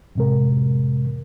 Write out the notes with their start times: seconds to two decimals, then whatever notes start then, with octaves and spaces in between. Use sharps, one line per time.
0.15 F2 A2 C3 G#3 A#4